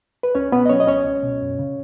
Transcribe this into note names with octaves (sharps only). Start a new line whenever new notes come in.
B4
C#2 C#4 C#5
B2 B3 B4
D#5
F#3 C#4 C#5
D#5
C#2 C#4 C#5
C#2
B2
F#2
C#3